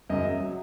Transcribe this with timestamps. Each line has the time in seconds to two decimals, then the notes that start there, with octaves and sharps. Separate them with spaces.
0.10 F#2 C#3 F#3 D#5
0.25 E5
0.40 F#3